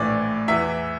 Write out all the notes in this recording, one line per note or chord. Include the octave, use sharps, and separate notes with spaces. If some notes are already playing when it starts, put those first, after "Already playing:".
Already playing: A#1 A2 E3 D5
E2 E3 E5